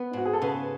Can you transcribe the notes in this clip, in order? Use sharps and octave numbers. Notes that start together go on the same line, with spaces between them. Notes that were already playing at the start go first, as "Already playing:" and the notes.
Already playing: B3 B4
G#2 F#4
G#4
A4
C#3 B4